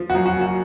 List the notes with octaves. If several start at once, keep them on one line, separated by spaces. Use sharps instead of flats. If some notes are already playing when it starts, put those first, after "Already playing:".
Already playing: F3
F#4
F#2
F#4
F#1
F#4